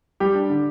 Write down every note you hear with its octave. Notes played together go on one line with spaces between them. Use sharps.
G3 G4
D4
D3